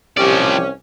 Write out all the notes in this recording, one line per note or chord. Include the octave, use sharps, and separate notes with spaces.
C2 F3 C#4 G4 D5